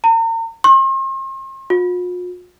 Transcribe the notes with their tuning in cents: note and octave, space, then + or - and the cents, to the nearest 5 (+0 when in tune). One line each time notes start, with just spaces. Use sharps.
A#5 -40
C6 +40
F4 +45